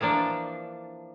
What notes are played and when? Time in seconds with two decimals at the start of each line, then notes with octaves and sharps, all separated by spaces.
0.01 E3 F3 A#3 D4